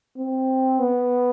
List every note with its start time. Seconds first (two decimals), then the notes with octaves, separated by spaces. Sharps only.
0.17 C4
0.79 B3